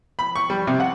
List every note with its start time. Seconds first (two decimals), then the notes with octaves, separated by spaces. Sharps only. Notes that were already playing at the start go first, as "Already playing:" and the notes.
0.19 B5
0.36 C#6
0.50 G3
0.67 C3
0.80 F#5